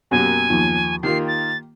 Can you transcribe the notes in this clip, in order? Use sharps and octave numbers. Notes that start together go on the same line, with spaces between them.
F#2 B2 F#3 A#3 G4 G#5
D#2 F3
D#3 A#3 F4 G4 C7
A6